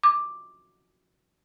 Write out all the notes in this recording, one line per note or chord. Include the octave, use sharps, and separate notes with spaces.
D6